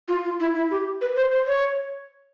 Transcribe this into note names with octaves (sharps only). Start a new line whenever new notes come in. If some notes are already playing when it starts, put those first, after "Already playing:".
F4
F4
E4
E4
G4
B4
C5
C5
C#5